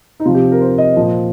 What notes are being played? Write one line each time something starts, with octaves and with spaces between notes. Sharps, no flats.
D#4
C3 F3 F4
G4
A#4
C5
D#5
A#2 F3